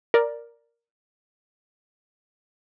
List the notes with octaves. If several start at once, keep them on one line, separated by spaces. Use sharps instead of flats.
A#4 D5